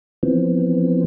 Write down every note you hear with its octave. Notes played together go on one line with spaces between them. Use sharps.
E3 F3 B3 C4